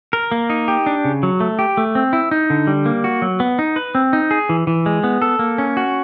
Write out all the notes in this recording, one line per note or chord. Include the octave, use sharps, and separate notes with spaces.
A#4
A#3
D#4
G4
D4
C#3
F#3
A3
G4
A3
C4
E4
D#4
D3
G3
A#3
F#4
F#3
B3
D#4
B4
C4
D#4
G#4
E3
E3
G#3
B3
A4
A#3
C#4
F#4